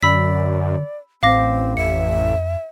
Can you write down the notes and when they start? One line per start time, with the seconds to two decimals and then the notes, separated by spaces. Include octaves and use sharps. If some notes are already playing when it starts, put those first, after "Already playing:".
0.03 F#2 D3 D5 B5 E6 B6
1.23 A1 A2 C4 F5 D6 A#6
1.77 F2 E5 C#7